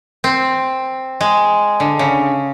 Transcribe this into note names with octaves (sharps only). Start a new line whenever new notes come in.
C4
G#3
D3
C#3